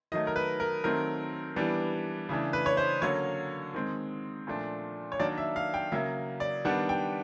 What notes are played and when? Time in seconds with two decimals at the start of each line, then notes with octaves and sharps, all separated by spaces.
0.12 D#3 F#3 A3 D#5
0.27 A#4
0.36 B4
0.60 A#4
0.84 D#3 F#3 A3 C4 A#4
1.56 E3 G3 B3 D4
2.29 C#3 E3 A3 D4
2.53 B4
2.66 C#5
2.77 C5
3.02 D3 F#3 A#3 C#4 C#5
3.74 D#3 G#3 C4
4.47 A#2 F3 A3 D4
5.12 C#5
5.19 D#3 F#3 A#3 D4 D5
5.38 E5
5.56 F5
5.74 G5
5.92 C#3 F#3 A#3 E5
6.40 D5
6.65 D#3 G3 B3 D4 F#5
6.89 G5